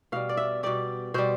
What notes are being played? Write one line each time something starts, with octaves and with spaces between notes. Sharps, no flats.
B2 G3 F5
D5
E5
B2 G3 D5
B2 G3 C5